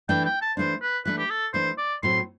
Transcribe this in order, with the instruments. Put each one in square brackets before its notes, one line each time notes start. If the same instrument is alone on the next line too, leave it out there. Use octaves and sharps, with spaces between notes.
[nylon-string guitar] E3 A3 D4 [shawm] G5
[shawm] G5
A5
[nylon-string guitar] E3 A3 D4 [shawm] C5
[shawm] B4
[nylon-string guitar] E3 A3 D4 [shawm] B4
[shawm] G4
A4
[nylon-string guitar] E3 A3 D4 [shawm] C5
[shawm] D5
[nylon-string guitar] A2 F#3 C4 [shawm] C6